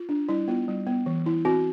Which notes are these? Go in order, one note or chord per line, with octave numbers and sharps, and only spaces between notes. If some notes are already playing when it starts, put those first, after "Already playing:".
Already playing: F4
D4
G3 E4
B3 F4
G3
B3
E3
E4
C4 F#4